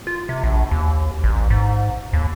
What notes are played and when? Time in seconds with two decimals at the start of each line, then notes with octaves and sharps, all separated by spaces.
0.07 F4
0.29 C3
0.44 A#1
0.71 D#2
1.24 A1
1.50 G#2
2.13 D#2